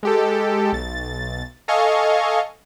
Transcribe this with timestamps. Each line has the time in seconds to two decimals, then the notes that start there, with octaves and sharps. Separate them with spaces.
0.03 G#3 G4 A4
0.72 B1 A6
1.68 A4 D#5 F5 G#5 C#6